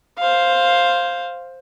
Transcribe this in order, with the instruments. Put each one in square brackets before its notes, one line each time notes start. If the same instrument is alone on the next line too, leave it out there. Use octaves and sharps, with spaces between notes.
[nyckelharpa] C5 F5